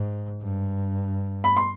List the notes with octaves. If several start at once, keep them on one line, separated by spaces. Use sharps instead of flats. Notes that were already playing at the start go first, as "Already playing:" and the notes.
Already playing: G#2
G2
B5
C6